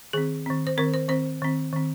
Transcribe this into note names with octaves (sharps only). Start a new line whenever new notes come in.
D#3 C4 G#4
D#3 C4
C5
D#3 C4 A#4
C5
D#3 C4 C5
D#3 C4
D#3 C4